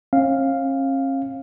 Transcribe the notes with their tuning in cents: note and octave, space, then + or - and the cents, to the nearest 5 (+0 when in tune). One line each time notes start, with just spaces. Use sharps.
C#4 -45 F5 +0